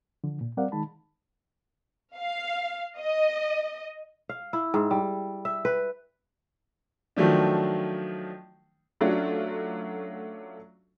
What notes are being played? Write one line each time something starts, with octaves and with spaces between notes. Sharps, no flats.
D3 F3
A#2
G3 C4 A#4 D5 F5 F#5
D#3 G#3 D#4 A5 B5
F5
D#5
F5
E4
G#2
G3
E5
B4
D#3 F3 F#3 A3 D4
F#3 A3 C#4 D4 F4 F#4